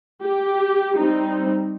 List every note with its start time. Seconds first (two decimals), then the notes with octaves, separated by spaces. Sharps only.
0.23 G4
0.96 G3 C4 D#4